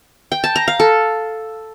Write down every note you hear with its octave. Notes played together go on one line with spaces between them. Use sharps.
G5
A5
A#5
F5
A4